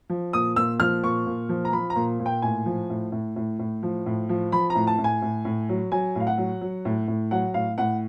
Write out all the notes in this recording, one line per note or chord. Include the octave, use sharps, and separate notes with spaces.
F3
A#2 D#6
A#2 E6
F3 F6
A#2 C#6
A#2
F3
A#5
F3 B5
A#5
A#2
A#2
G5
A2 G#5
F3
A2
A2
A2
A2
F3
A2
F3
F3 B5
A#5
A2
A5
A2
G#5
A2
A2
F#3
F#3 G#5
A2 F5
F#5
F#3
F#3
A2
A2
F#3 F#5
A2 F5
A2 F#5